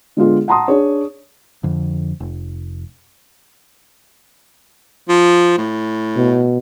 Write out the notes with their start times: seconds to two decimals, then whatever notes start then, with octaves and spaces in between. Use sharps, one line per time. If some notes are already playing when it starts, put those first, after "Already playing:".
0.17 D3 G#3 B3 F4 G#4
0.48 F#5 A5 A#5 C6 D#6
0.68 D4 G#4 C#5
1.63 F2 D3
2.20 F1
5.09 F3
5.58 A2
6.16 B2